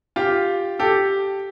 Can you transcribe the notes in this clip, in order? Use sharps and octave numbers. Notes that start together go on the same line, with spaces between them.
F4 G4
G4 A4